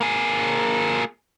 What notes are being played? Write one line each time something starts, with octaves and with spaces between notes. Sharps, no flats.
A#3 G#4